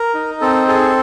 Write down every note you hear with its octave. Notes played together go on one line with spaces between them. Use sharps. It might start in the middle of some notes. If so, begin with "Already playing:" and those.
Already playing: A#4
D#4
C4 A4
G#4 A4